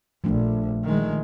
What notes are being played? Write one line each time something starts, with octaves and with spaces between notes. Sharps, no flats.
A#1 F3 A3 D4
D#3 G#3